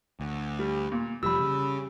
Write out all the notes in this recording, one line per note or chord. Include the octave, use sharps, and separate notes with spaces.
D2
G3
A#2
F1 F3 G3 B5 E6
C#3